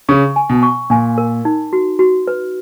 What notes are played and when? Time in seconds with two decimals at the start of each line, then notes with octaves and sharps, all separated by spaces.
0.09 C#3 C#6
0.36 G#5
0.50 B2
0.63 C#6
0.90 A#2 G#5
1.18 A#4
1.45 D#4
1.73 F#4
1.99 F#4
2.28 B4